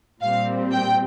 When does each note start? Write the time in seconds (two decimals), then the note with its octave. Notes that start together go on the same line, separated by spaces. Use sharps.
0.21 A#2 G3 C4 F5
0.72 G5